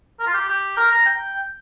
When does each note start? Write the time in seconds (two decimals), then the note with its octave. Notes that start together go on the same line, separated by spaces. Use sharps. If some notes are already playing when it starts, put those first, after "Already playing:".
0.20 A#4
0.27 F4
0.34 G4
0.48 G4
0.77 A#4
0.92 A#5
1.06 G5